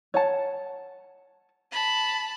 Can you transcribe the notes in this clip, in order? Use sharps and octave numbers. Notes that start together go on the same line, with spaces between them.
C#5 F#5 A5
A5 B5